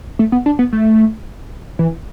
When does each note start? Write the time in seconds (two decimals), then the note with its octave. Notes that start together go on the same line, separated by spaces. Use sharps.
0.19 A3
0.32 B3
0.46 D4
0.59 B3
0.73 A3
1.79 E3